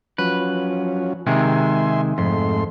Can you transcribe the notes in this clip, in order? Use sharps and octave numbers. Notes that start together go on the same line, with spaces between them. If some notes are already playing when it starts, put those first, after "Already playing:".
F3 F#3 C#4 B4
C3 D#3 G#3 E5 G#5 C6
F2 G#2 A3 C6